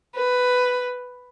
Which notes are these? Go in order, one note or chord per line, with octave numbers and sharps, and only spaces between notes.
B4